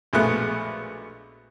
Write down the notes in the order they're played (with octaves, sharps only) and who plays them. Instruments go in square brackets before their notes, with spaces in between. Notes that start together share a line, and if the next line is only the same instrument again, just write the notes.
[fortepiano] A#1 B2 G#3 A3 B3 F#6